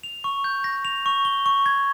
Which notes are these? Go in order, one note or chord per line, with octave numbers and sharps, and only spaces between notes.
F7
C#6
G6
A#6
F7
C#6
G7
C#6
G#6